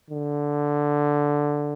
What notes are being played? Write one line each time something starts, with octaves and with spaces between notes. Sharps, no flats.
D3